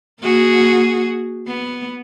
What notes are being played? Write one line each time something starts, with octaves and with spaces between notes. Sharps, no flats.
A#3 F#4 G#4
B3